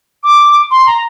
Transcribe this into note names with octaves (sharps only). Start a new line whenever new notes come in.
D6
C6
A#5